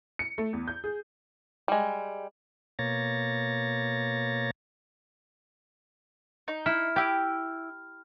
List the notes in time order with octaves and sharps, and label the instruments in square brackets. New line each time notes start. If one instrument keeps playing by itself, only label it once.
[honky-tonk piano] C#7
A3
E2
G6
G#4
[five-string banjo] G3 G#3
[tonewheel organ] B2 A#3 C#5 A6 A#6
[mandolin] D#4
[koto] E4 [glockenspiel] F6
[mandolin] E4 G6 [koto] G4